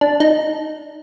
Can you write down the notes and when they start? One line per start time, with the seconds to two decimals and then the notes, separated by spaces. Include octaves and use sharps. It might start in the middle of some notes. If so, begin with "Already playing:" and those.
0.01 D4
0.20 D#4